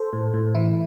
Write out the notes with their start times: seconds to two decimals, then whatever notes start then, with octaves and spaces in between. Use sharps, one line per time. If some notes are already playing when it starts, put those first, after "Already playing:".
Already playing: A4 C5
0.13 A2
0.34 A2
0.55 E3 E4